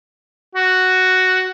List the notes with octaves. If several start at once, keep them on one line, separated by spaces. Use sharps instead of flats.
F#4